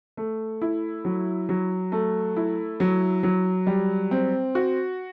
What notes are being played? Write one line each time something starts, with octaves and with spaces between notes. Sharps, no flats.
A3
E4
F#3
F#3
A3
E4
F#3
F#3
G3
C4
F#4